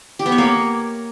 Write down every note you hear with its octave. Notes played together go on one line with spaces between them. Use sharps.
G4
B3
C#5
A#3